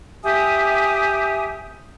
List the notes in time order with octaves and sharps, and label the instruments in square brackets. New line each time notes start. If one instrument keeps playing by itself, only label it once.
[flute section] G4 E5 G#5 D#6